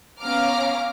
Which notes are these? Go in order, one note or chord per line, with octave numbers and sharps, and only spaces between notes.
B3 C#4 F5 A#5 D6 F6